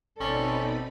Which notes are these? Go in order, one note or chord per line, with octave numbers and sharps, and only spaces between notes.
G#1 B2 C4 C#4 D#4 A4 D5 B5